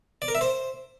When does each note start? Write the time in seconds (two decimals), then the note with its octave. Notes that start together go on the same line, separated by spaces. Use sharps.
0.22 D5
0.28 A#4
0.35 E5
0.41 C5